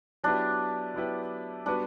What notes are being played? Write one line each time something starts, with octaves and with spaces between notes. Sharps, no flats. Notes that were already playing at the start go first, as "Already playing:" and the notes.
F#3 B3 D4 E4 G4 B4
F#3 B3 E4 G4 B4
G3 B3 D4 F#4 B4